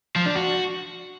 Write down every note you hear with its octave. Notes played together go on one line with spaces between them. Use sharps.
F3
D4
F#4